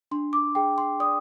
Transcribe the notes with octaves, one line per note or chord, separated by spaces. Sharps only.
D4 C6
D6
G#4 G5
C6
D5 D#6